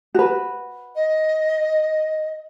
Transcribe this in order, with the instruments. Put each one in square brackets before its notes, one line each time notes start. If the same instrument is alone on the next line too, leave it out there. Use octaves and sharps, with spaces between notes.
[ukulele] F#4 B4
[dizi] D#5